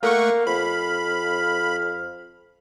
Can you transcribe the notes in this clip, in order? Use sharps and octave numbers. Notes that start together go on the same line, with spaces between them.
A3 A#3 F5 F#5 C#6
F2 B5